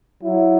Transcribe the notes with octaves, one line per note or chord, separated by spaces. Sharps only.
F#3 E4